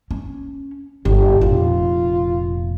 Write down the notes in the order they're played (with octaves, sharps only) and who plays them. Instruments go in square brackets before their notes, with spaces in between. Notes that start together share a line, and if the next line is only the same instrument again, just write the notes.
[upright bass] C#4
[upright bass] G1 E4 [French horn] G4
[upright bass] F1 A#2 [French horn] F4